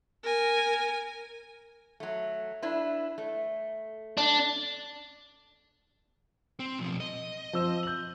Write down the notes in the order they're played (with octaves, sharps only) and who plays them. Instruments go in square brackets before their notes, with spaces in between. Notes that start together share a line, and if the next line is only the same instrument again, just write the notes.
[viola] A#4 G#5
[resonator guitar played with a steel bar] F#3 A3
D4 E4 B4
A3
[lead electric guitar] D4
C4
B1 F3
D#5
[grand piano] F3 C4 E6
G6 F#7